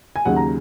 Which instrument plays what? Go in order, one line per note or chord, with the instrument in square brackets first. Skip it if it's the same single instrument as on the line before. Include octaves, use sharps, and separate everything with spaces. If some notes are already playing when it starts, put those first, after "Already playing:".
[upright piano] G#5
D#2 C#3 F#3 F#5
A#5